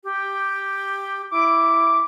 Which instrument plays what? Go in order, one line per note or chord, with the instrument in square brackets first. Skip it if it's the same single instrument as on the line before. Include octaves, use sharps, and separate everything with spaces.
[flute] G4
[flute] E4 [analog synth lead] D6